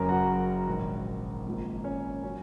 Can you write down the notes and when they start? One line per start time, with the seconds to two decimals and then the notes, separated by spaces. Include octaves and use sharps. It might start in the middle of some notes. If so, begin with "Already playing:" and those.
Already playing: F#1 F#2 C#3 F#3 C#4 A#4 A#5
0.09 F#4 F#5
0.67 A#1 G#2 D#3
1.45 G#1 G#2 F3 A#3
1.84 C#4 C#5
2.23 F#3 C#4